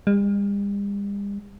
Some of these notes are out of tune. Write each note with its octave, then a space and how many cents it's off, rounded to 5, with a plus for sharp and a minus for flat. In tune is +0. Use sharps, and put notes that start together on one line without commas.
G3 +45